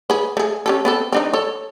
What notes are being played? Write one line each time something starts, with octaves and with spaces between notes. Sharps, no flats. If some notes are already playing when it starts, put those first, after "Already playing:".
G#4 B4
A3 G#4
C#4 G4 A4
B3 C4 A4
C4 D4 D#4
A4 C#5